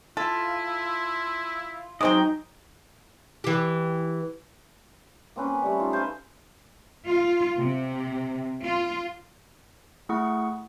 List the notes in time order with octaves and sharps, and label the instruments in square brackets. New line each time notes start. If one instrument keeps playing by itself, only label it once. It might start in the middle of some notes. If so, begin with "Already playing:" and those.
[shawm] E4 [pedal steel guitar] F4 [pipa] A4
[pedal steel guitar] F#3 C#5 D#5 [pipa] G#3 C4 G5 [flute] D#4
[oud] E3 G4
[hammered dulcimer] A#3 C4 C#4 B4
B5
G3 A3
D#4 F4
C5 F5 G#5 B5
[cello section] F4
C3
F4
[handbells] A3 E4 G#4 F#5 C#6